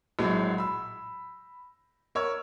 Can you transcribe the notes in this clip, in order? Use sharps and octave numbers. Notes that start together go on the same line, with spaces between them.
A#1 A2 F#3 G#3
B5 E6
A#4 C#5 E6